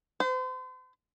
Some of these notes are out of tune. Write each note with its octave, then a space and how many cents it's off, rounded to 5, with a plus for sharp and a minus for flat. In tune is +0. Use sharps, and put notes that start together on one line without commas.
C5 -40